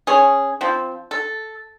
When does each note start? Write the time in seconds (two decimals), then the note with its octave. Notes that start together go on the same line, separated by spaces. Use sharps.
0.07 C#4 G#4
0.61 F3 C4
1.11 A4